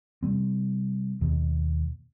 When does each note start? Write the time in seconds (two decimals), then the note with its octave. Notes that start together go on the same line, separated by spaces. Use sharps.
0.23 C3 G3 C4
1.21 D#2 B2